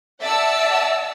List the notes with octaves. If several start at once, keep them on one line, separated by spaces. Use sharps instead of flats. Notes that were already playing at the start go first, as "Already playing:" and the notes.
D5 E5 F#5 A5 E6